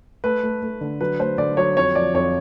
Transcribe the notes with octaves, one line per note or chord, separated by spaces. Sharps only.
A3 B4
A3
A3
D3
F#3 B4
A3 C5
D3 D5
F#3 C#5
F2 C#5
F3 D5
F2 C#5